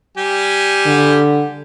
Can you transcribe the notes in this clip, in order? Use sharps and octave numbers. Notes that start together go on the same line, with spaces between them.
G3 G4 G#5
D3